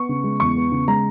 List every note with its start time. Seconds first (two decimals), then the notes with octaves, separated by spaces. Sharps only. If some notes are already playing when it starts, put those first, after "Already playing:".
Already playing: B3 C#6
0.09 C#3
0.24 G#3
0.40 E2 C#6
0.56 B3
0.72 C#3
0.88 G#3 A#5